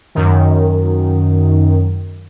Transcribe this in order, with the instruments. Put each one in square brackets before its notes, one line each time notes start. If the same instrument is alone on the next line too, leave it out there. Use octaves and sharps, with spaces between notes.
[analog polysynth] F#2 D#3